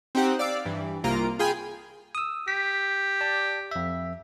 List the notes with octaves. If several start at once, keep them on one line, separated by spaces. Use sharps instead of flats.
C4 D#4 G4 F#5
D5 F5 D6 E6
G2 E3
C2 C3 A#3 F4 A#5 D7
F4 G#4 G5 G#5 B5
D#6 E6
G4 B6
D5 A5
F2 E5